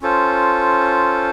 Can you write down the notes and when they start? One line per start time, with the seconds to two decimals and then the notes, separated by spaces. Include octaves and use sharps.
0.02 C#4 F4 A4 C5